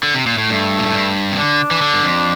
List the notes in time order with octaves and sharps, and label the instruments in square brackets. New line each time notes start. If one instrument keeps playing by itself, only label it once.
[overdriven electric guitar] D3
C3
A#2
A2
[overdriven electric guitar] G2 [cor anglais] A3
[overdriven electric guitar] A#2
A2
G2
C3
[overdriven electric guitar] D3 [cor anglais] D4
[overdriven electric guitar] E3
D3
G2
F2